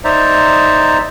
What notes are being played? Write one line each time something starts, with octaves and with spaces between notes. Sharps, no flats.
D#4 C5 D5 E5 A#5